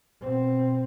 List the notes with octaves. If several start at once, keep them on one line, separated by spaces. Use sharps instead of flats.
B2 C4